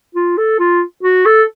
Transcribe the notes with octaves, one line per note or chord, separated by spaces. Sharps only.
F4
A4
F4
F#4
A4